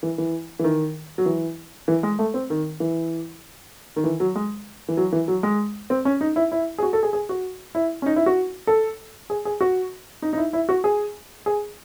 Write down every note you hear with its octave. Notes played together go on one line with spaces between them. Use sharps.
E3
E3
E3
D#3
F#3
E3
E3
G#3
A3
C4
D#3
E3
D#3
E3
F#3
G#3
E3
F#3
E3
F#3
G#3
C4
C#4
D#4
E4
E4
G#4
F#4
A4
G#4
G#4
F#4
E4
C#4
D#4
E4
F#4
A4
G#4
G#4
F#4
D#4
D#4
E4
E4
F#4
G#4
G#4